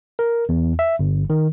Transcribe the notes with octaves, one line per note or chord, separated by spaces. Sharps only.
A#4
E2
E5
G1
D#3